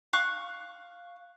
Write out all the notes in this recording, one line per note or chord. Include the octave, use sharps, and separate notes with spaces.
F5 C#6 F#6